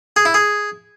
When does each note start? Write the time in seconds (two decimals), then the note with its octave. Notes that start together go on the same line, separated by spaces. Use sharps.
0.16 G#4
0.25 E4
0.34 G#4